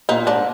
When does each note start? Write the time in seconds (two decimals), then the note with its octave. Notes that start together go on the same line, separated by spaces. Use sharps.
0.09 A#2 D#4
0.27 G#2 D4